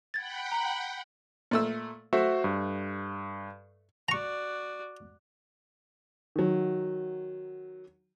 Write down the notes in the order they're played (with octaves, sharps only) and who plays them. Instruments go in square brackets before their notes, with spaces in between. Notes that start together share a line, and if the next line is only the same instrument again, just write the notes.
[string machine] F#5 G5 B5 [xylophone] G#6 A6
[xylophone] A#5
[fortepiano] A#2 A3 E6
[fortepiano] A3 [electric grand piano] F#4 C5 E5
[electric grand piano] G2
[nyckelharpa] F#4 D5 [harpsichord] A#5 C#6
[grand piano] D#3 F#3